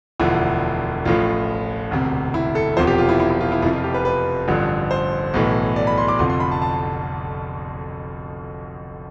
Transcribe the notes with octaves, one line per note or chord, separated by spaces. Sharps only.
E1 D2 D3 F3 E4
A1 A2 F3 F4
E1 D2 C3
E4
A4
E1 E2 C3 F3 C5
G4
F4
E4
E4
E4
F4
E4
F1 F2 C3 F3 E4
F4
G4
B4
B4
A1 G2 D3 F3
C5
B1 A2 E3
D5
B5
C6
D6
F1 F2 D3 F3 C6
C6
B5
A5
A5